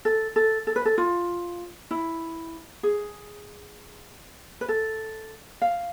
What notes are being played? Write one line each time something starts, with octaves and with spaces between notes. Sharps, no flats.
A4
A4
A4
B4
A4
F4
E4
G#4
B4
A4
F5